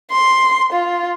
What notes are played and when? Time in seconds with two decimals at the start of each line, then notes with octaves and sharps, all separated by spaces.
0.12 C6
0.72 F4